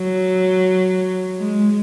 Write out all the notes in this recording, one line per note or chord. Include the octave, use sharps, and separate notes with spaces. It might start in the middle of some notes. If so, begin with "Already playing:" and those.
Already playing: F#3
G#3